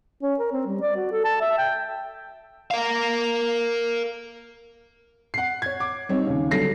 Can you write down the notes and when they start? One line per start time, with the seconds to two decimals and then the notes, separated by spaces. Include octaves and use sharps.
0.23 C#4
0.39 A#4
0.52 C4
0.67 G3
0.82 D5
0.96 F#4
1.12 A4
1.25 A5
1.41 E5
1.58 G5
2.71 A#4 F5
5.34 F#5 C7
5.62 C#5 G#6
5.80 D6
6.09 G3 C4 D#4 C#5
6.27 D#2 C#3
6.51 D3 F#3 G3 A4 A#6 C7